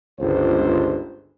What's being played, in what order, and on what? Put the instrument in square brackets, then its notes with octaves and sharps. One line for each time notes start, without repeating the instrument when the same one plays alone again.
[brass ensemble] G1 C#2 C5